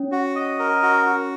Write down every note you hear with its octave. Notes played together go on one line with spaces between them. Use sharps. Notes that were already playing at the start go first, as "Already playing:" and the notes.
Already playing: C#4
F#4
D#5
A#4
F#4
F#4